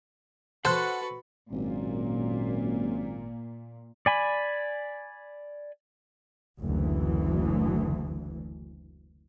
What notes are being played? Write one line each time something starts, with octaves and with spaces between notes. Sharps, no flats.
F#4 A4 B4 C5 F#5 F#6
G#1 F#2 A#2
D5 G#5 B5
F#1 D2 E3